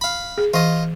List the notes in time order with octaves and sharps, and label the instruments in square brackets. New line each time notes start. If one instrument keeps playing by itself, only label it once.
[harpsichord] F5 B5
[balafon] G#4
[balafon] E3 [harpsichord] F4 D#5